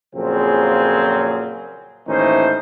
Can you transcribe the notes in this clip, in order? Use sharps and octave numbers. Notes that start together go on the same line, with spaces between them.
F2 A#2 C#3 F#3 C4 G#4
D#2 A2 E3 C#4 D#4 C5